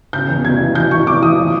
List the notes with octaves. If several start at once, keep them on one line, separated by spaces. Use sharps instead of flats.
C#3 G6
E2
F1 G#6
E3
E3 G6
E3 C#6
F1 D6
E3 D#6
F3